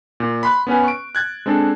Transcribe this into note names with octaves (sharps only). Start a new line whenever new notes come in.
A#2
B5 C6 F#6
B3 C#4 B4 G#5
C#6 D7
F#6 G#6 A6
G#3 C4 D4 A4